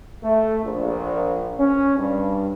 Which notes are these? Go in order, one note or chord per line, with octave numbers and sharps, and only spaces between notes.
A3
A#1
C#4
G2